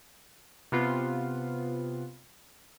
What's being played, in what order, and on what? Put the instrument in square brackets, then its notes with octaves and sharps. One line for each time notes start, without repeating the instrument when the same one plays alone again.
[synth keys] C3 B3 F4